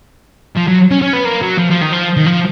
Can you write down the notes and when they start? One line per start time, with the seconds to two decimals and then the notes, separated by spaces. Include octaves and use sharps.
0.57 F3
0.68 F#3
0.91 C#4
1.02 C#4
1.13 B3
1.25 A#3
1.42 F#3
1.59 F3
1.70 F3
1.82 D#3
1.93 F3
2.17 D#3
2.26 F3